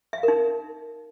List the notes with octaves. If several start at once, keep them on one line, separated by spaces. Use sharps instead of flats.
E5
F5
A#4
D#4